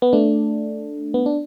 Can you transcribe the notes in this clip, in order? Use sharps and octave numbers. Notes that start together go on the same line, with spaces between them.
B3
A3 D4
B3
D4